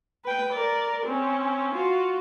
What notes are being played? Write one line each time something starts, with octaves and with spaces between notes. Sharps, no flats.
B4 G5
A#4 D5
C4 C#4
F4 F#4